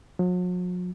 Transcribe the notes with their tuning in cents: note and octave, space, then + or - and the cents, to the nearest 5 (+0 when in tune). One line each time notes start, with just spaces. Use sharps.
F#3 -45